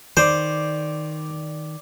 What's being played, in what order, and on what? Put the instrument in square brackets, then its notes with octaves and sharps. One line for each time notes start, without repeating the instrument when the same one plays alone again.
[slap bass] D#3 [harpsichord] C5 [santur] D5